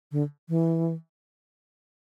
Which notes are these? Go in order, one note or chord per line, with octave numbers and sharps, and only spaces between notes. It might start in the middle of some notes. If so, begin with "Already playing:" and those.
D3
E3